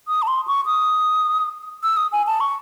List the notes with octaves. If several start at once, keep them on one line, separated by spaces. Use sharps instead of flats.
D#6
A5
C6
C#6
D#6
E6
D#6
G#5
A5
C#6